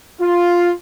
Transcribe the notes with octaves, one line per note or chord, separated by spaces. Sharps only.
F4